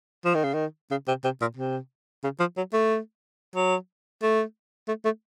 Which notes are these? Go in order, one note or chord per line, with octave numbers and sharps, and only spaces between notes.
F3
D#3
C#3
D#3
C#3
C3
C3
A#2
C3
C#3
F3
F#3
A3
F#3
A3
A3
A3